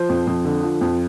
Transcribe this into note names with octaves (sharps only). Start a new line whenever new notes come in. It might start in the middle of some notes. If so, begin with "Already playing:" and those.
Already playing: F3 C5
F2
F2
D3
F3
F2